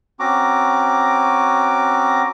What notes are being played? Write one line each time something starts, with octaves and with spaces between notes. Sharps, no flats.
C4 C#4 F#4 A#5 D6